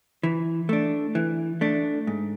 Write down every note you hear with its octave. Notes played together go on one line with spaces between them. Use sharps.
E3
A3 D4
E3
A3 D4
G#2